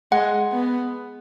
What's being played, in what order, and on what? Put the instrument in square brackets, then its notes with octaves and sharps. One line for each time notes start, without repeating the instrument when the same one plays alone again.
[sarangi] G#3 [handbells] F#5
[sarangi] B3